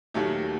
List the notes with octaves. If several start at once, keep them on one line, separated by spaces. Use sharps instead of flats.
D#2 D#3 F#3 A3 G4